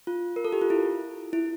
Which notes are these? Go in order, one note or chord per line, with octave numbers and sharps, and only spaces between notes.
F4
A#4
A4
G4
F4
E4
E4